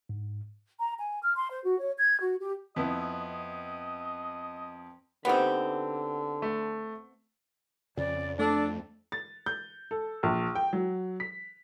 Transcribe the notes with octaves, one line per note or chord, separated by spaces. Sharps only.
G#2
A#5
G#5
F6
C6
C5
F#4
C#5
G#6
F#4
G4
F2 B3 E4 D#5
D3 B3 C4 D#4 G4 B4
A3
F2 C#3 D5
A3 D4 A4
A6
G6
A4
A#1
G5
F#3
B6